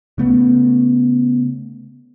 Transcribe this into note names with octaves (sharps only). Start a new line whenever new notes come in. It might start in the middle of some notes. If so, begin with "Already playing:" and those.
C#3 A3 B3